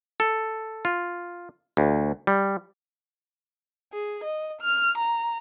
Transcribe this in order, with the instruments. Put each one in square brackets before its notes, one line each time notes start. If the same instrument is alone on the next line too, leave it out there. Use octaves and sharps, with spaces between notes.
[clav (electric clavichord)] A4
F4
D2
G3
[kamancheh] G#4
D#5
F6
A#5